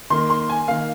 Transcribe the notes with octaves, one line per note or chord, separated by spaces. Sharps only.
D#3 A#3 C6
C6
G#5
D#3 A#3 F5